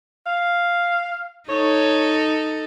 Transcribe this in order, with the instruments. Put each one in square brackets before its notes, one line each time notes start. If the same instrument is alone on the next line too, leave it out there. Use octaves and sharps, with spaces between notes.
[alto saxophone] F5
[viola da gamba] D#4 A4 [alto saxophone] C#5